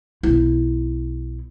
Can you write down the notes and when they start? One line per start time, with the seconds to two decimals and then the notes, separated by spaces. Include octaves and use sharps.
0.23 B1 E4